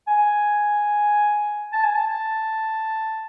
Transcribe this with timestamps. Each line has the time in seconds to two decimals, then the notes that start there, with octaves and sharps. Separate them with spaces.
0.08 G#5
1.73 A5
1.84 G#5
1.95 A5